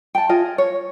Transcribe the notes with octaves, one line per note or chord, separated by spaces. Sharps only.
G5 A5
F4 G#4 D#5
C#5